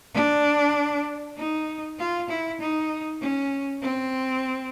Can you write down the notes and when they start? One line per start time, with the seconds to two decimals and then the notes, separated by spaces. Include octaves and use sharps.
0.15 D4
1.37 D#4
1.99 F4
2.29 E4
2.60 D#4
3.21 C#4
3.82 C4